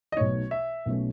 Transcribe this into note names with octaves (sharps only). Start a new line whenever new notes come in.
D#5
B1 B2 A3 D#4 C#5
E5
B1 B2 A3 C#4